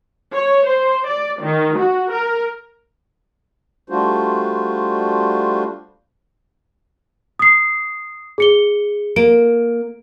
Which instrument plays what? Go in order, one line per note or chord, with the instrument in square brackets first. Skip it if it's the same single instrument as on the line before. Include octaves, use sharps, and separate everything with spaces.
[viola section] C#5
C5
D5
D#3
F#4
A#4
[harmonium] G3 A3 D4 F4 F#4 C5
[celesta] D#6 C7
G#4 C#7 G7
[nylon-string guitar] A#3 [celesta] D7